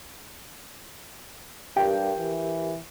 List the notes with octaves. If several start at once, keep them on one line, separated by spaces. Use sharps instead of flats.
G2 G4 A#4 G5
E3